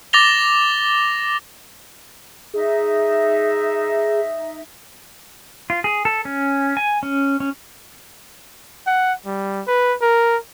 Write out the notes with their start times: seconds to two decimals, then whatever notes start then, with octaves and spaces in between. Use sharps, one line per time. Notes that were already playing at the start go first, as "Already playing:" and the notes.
0.13 D6 A6 A#6 F7 G7
2.54 D#4 G#4 E5
5.70 F4
5.84 G#4
6.05 A4
6.25 C#4
6.77 G#5
7.03 C#4
7.40 C#4
8.87 F#5
9.26 G3
9.67 B4
10.02 A#4